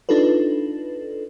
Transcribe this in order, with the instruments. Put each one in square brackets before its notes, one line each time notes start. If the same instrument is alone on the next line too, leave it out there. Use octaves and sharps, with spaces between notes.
[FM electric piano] D4 D#4 F4 A4 B4